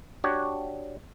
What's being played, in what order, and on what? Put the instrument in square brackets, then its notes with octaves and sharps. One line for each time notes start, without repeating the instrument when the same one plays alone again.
[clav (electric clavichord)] D4 F#4 G4 C#5